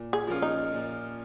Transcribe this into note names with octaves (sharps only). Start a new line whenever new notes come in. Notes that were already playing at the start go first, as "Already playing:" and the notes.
Already playing: A#2
G#4
F3 A#3 C#4 F4
D#4
A#2